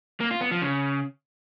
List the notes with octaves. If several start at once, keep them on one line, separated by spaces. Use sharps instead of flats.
A#3
F4
B3
F3
C#3